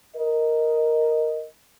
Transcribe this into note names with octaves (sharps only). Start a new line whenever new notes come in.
A#4 D#5